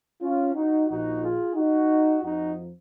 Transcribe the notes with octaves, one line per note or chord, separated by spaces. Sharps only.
C#4 F4
D#4 F#4
A#1 A#2 F3 D#4 F#4
F4 G#4
D#4 F#4
F2 F3 D#4 F#4